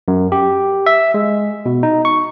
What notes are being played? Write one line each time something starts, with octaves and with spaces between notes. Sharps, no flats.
F#2
G4
E5
G#3
B2
D#4
C#6